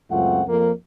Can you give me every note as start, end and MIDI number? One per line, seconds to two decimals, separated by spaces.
0.10 0.42 37
0.10 0.42 42
0.10 0.42 57
0.10 0.42 60
0.10 0.42 65
0.10 0.42 78
0.48 0.71 41
0.48 0.71 58